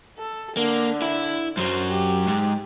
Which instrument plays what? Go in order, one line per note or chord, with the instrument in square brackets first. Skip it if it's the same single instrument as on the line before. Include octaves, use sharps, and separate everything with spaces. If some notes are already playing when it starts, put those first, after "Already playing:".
[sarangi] A4
[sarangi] D3 [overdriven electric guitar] A#3
[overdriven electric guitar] E4 E5
[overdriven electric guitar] F#2 F#3 [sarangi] C5
[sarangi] G4
[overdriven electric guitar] G#2